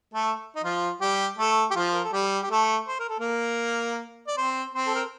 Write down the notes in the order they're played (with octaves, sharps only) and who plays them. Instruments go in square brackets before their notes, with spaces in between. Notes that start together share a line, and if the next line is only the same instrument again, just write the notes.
[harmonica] A3 A4
D#4
F3 F4
G3 G4
A3 A4
G4
F3 F4
A#4
A4
G3 G4
G4
A3 A4
C5
A#4
A4
A#3 A#4
D5
C4 C5
C4 C5
A4
A#4